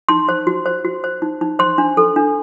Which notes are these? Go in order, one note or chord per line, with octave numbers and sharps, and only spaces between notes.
D#4 C6
C5
F#4
C5
F#4
C5
D#4
D#4
C5 C6
D4
A4
D4